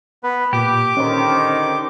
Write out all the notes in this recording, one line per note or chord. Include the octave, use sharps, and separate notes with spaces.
B3 B4
A#2 G4 D6
D3 D#3 C#4 C5